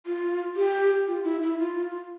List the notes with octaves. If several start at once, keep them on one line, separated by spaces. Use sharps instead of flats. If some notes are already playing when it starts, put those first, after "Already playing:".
F4
G4
F4
E4
E4
F4